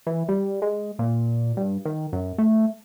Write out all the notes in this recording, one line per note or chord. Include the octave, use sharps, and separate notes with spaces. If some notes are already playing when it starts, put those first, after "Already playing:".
E3
G3
G#3
A#2
G2
D#3
F#2
A3